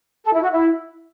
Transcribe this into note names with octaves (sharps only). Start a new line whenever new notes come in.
A4
E4
F#4
E4